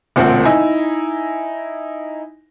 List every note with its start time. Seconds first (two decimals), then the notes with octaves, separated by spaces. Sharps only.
0.16 E1 D2 A#2 C4 C5 F#5
0.45 D#4 E4 G#5